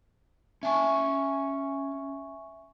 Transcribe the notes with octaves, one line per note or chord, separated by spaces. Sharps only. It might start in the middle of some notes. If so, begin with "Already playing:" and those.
C#4 E5 G#5 A5 C#6